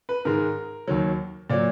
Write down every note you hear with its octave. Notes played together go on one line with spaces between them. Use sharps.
B4
G#2 D#3 G#3 A#4
D#2 D#3 F#3
A#2 F#3 D5